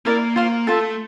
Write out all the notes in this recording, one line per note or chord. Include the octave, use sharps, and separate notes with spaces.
A#3 E4 A#4 D5
A#3 F4 C5 F5 C6
A3 F4 A4 E5 A5